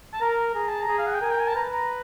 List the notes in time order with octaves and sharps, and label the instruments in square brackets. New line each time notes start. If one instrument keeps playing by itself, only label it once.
[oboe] A5
[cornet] A#4 [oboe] A#5
[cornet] G#4 [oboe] A#5
[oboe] A5
A#5
[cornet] G#4
[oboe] F5
F#5
G5
[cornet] A#4 [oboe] G#5
[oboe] G5
G#5
A5
[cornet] B4 [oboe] A#5
[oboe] A#5